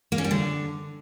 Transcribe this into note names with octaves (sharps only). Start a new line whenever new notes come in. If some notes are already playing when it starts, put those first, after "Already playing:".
A#3
C#4
G3
D3